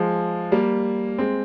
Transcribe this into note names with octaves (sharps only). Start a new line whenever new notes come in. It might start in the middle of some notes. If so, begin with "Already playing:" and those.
Already playing: F3 G#3
G3 A#3
G#3 C4